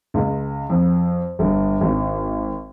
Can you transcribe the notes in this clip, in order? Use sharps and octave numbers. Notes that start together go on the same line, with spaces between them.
C#2
F2
G1
G#1